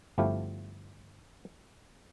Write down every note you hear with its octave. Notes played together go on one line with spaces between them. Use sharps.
G1 F3 A3 E4 G4 F5